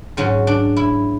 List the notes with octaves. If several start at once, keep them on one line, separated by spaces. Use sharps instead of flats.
G#2 F#3 C#4
D4
E4